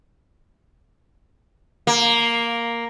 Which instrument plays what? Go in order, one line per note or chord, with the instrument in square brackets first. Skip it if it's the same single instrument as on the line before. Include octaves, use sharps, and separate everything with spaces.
[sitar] A#3